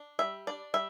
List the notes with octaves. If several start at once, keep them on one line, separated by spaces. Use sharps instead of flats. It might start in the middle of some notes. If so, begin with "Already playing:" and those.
Already playing: D4
G3 E5
D4 D5
G3 E5